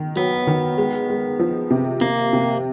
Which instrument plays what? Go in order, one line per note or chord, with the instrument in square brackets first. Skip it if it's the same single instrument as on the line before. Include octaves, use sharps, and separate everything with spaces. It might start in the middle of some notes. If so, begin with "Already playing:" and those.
Already playing: [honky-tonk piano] D#3
[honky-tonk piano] F#3 [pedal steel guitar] B3
[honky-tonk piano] D#3
G#3
G#3
F3
C3
[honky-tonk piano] C3 [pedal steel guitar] A#3
[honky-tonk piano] C3